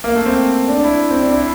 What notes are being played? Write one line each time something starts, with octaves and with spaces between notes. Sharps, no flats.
A#3
A3
C4
D4
E4
C4
D4
E4